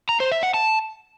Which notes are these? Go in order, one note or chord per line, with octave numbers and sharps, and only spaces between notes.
A#5
C5
E5
F#5
A5